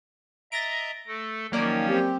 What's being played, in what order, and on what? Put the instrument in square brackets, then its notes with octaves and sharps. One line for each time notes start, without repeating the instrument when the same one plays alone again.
[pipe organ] D#5 E5 A#5 [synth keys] A6 A#6 D7
[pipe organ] A3 A4
[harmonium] D#3 [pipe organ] F3 C#4 C#5 [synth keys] F#3 A#3 D5
[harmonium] C4 G4